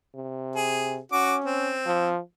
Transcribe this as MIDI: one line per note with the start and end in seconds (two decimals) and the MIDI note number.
0.15 0.99 48
0.56 0.99 68
1.12 1.73 61
1.12 1.36 66
1.12 1.36 86
1.44 2.09 60
1.86 2.20 53